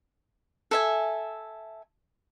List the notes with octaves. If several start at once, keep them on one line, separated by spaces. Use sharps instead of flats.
A4 E5 G#5